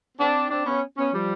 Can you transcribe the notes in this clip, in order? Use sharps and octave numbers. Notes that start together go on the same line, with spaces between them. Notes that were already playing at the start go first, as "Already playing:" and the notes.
C4 D4
C4 D4
B3 C#4
B3 C#4
F3 G3